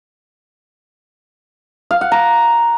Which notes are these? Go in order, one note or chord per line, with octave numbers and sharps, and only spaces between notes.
F5
F#5
A#5